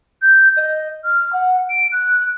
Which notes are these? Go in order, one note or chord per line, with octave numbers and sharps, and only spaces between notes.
G6
D#5
F6
F#5
D7
F#6